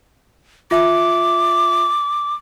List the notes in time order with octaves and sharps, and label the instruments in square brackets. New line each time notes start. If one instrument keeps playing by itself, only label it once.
[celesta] F4 E5 [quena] D6